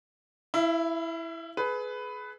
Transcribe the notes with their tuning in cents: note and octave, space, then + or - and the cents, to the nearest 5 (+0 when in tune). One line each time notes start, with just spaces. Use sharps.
E4 +0 E5 +45
G#4 +30 B4 +10